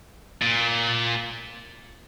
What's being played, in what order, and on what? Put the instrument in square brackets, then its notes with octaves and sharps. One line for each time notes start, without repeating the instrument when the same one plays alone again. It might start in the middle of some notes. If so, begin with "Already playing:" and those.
[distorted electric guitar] A#2